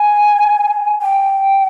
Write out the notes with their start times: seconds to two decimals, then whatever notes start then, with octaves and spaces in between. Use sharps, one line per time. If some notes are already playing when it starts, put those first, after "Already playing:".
Already playing: G#5
1.02 G5